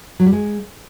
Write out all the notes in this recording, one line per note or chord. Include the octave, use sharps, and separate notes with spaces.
F#3
G3
G#3